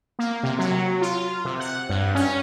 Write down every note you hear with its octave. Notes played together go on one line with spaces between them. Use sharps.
A#3
C3
F#3
F4
C3
F#5
G2
C#4